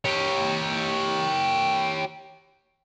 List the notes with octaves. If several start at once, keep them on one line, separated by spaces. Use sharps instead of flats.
G4 C#5